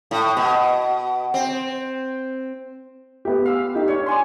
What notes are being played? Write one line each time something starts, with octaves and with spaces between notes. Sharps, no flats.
A2
B2
C4
B3 G4
F5 E6
D#4 G4
D4 C#5
D5 G#5 C6